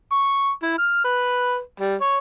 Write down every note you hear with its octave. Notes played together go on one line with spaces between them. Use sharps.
C#6
E4
F6
B4
G3
C#5